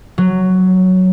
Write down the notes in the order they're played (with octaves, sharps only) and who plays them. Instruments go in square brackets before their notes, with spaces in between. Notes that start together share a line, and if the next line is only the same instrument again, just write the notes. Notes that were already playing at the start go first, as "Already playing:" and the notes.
[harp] F#3